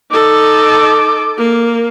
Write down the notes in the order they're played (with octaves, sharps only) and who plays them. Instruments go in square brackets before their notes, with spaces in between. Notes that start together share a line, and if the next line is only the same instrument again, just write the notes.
[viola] D#4 A4 [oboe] D6
[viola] A#3